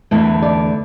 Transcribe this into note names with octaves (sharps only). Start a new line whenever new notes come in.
E2 D3 A3 E4 E5
D5